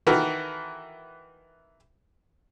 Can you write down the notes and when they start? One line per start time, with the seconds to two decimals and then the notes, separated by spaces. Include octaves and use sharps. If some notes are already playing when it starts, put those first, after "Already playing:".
0.07 D#3 E3 F#4 A4 A#4